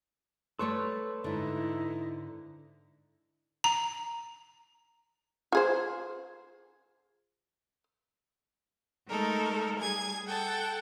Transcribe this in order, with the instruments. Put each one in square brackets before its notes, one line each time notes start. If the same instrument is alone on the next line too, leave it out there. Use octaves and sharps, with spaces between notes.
[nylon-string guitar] A3 C#5 D5 [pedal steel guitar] A4 B4 C#6 [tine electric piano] C6
[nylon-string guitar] G#2 D3 [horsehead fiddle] D#4 E4
[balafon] A#5
[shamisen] F4 G#4 C5
[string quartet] G#3 A3 D#4 A4 A#4
G3 G#4 G#5 G#6
A4 F#5 G5 A5